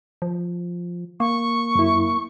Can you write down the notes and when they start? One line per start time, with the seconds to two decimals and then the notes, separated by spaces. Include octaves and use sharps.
0.22 F3
1.20 A#3 C#6
1.75 F#2 E4